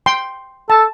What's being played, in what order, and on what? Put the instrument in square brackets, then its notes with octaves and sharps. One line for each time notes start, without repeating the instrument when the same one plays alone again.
[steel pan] G5 C6
[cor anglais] A4 [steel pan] A5